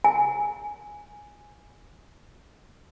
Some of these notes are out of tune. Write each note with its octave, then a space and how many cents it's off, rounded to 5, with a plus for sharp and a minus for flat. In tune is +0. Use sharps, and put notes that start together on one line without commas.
G#5 -5